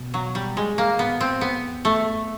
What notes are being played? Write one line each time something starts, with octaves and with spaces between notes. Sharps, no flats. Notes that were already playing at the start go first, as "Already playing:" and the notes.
Already playing: B2
F#3
G3
A#2 G#3
A#3
A2 B3
C4
F2 B3
E2
F2 A3
F#2